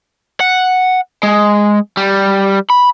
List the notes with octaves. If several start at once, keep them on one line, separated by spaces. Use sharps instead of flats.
F#5
G#3
G3
B5